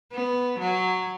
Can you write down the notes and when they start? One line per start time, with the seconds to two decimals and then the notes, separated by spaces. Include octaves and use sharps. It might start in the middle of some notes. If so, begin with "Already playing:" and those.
0.12 B3
0.59 F#3